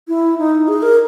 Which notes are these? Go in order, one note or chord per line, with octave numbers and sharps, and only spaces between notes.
E4
D#4
G#4
A#4